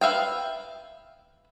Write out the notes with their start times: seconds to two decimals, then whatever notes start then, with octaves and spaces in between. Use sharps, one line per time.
0.01 B4 E5 F5 G5